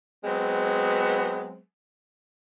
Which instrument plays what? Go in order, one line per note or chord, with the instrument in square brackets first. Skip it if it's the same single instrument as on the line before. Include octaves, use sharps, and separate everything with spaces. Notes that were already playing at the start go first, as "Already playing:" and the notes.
[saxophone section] F#3 G#3 B3 C4